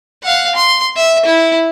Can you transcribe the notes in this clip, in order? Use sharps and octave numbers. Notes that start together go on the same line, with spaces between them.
F5 F#5
C6
E5
E4